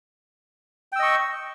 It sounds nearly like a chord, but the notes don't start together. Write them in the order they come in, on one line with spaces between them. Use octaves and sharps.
G5 E6 D#5 C#6